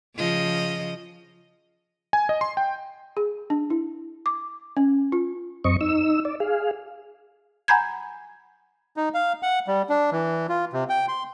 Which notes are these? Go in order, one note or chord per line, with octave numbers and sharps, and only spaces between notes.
C#3 F3 D#5
G#5
D#5
C6
G5
G#4
D4
E4
D6
C#4
F4
F#2 C4 D#5 C#6
D#4 E6
D5
G#4 F5
F#5 G#5 A#5 B5 G6 G#6
D#4
F5
F#5
G3
D4
E3
F4
C3
G5
C6